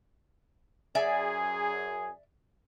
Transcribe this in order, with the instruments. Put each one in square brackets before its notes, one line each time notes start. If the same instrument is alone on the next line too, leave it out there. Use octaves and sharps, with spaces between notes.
[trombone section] F#2 G#4 [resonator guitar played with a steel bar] D5 E5 G#5